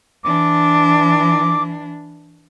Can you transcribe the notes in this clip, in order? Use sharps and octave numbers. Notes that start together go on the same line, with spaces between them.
E3 D4 D6